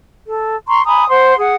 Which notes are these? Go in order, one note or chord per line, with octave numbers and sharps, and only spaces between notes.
A4
A#5 C6 C#6
G#5 A#5 B5 D#6
C5 F#5 C6
G#4 F#5